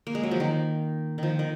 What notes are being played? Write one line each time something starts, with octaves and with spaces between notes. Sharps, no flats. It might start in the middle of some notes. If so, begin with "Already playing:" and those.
A#3
G#3
F#3
F3
D#3
D#3 F3
D#3